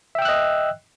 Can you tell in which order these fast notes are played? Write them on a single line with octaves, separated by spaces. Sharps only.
E5 G5 E6 F#6 D#5